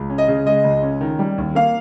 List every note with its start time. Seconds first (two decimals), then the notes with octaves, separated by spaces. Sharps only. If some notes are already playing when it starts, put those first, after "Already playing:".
Already playing: C#2
0.10 C#4
0.18 D#5
0.28 C#3
0.46 G#3 D#5
0.64 C#2
0.82 C#4
1.01 D#3
1.19 G3
1.38 D#2
1.55 A#3 F5